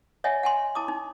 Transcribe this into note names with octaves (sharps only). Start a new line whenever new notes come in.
C#5 D#5 E5 F#5 G#5
F#5 G#5 C6
E4 A5 D6 D#6
D#4